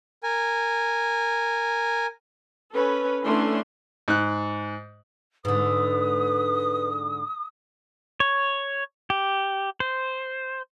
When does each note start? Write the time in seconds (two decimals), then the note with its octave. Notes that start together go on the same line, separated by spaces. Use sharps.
0.23 A#4 G#5
2.73 C#4 A4 B4
3.24 D3 E3 A3 C#4 D4 C6
4.08 G#2 F#6
5.45 G#2 D3 B4 D#6
8.20 C#5
9.10 G4
9.80 C5